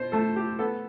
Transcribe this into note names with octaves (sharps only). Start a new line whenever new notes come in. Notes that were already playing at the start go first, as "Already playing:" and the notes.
Already playing: B2 C5
A3 A4
G4
B3 A4